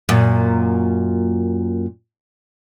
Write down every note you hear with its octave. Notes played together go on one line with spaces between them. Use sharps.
F#2 A#2